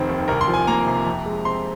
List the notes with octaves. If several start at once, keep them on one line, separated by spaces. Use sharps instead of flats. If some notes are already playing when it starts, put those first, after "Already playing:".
Already playing: F1 D#3 C4
D#2
C2 A#4
C6
F3
G#5
A#3 A#5
C3
F2
G#3
C4 C6